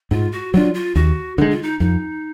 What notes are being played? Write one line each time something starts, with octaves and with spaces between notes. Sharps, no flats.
G#2 F4
F#4
F#3 D4 F4
F4
D#2 F#4
D3 G#3 D#4
F4
D#4
F2 D#4